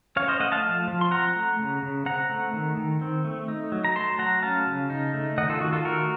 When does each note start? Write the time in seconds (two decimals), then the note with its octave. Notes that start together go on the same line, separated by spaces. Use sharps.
0.16 C#4 C#5 F5
0.28 C5 D#5
0.40 A3 D#5 F#5
0.52 F5 A5
0.64 F3
0.88 F3
1.01 C6
1.11 C4 F#5 A#5
1.35 A3
1.59 C#3
1.83 C#3
2.06 C4 F#5 A#5
2.30 A3
2.53 D#3
2.77 D#3
3.01 C4
3.24 A3
3.48 D#4
3.72 F#3
3.85 A#5
3.95 A3 A5 C6
4.19 F#3 F#5 A#5
4.43 C#4 F5 A5
4.67 C#3
4.90 D#4
5.14 A3
5.38 D#3 D#5 F#5
5.49 F4 A4
5.61 D#3 F#4
5.73 F4 A4
5.85 A3 F#4 A#4